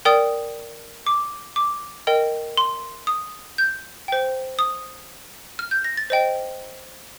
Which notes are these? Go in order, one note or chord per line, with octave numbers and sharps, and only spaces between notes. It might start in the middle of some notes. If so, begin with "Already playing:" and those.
A#4 D5 G5 D#6
D6
D6
A#4 D#5 G5
C6
D#6
G6
C5 G5
D#6
F6
G6
A#6
A6
C5 D#5 G5